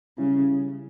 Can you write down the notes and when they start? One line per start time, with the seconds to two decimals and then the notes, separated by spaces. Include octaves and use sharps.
0.18 C#3 G3 C#4 E4